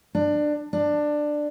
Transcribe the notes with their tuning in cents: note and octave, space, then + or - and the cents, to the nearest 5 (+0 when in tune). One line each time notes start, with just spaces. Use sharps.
D4 +20
D4 +15